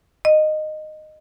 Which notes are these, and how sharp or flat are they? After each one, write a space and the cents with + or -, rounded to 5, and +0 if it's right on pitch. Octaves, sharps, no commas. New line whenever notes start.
D#5 -15